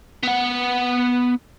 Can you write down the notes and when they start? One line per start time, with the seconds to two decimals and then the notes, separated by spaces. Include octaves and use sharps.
0.23 B3 F#5